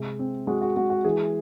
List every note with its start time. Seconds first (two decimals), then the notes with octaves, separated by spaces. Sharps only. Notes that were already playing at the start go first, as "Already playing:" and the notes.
Already playing: C3 G#3
0.19 C4
0.47 G#3 F#4
0.62 F#4
0.77 G#3 F#4
0.90 F#4
1.05 E3 G#4